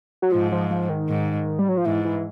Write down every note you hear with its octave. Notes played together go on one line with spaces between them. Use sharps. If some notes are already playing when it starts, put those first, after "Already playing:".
F#3
G#2 F3
F3
F3
D#3
G#2
G3
F#3
F3
G#2 E3
E3